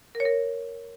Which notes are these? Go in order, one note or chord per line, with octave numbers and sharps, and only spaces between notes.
A#4
C#5
A#4